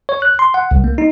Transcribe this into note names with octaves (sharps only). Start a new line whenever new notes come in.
C#5
F#6
C6
F#5
C2
A#3
D#4